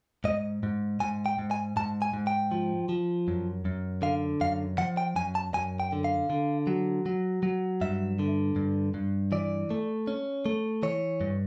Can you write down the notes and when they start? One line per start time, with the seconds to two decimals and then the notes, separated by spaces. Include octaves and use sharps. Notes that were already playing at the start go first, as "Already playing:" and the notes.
0.24 G#2 D#5
0.63 G#2
1.00 G#2 G#5
1.26 G5
1.39 G#2
1.51 G#5
1.77 G#2 A5
2.02 G#5
2.13 G#2
2.27 G5
2.52 F3
2.89 F3
3.28 F#2
3.65 F#2
4.02 D3 F5
4.41 F#2 F5
4.78 F3 F#5
4.97 G5
5.16 F#2 G#5
5.35 A5
5.54 F#2 G#5
5.80 G5
5.92 D3
6.04 F5
6.30 D3
6.67 F#3
7.06 F#3
7.43 F#3
7.81 G2 E5
8.19 D3
8.56 G2
8.94 G2
9.32 E3 D5
9.70 A3
10.07 C#4
10.46 A3
10.83 E3 C#5
11.21 G2